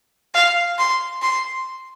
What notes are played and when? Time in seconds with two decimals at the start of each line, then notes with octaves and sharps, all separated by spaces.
0.34 F5
0.78 C6
1.22 C6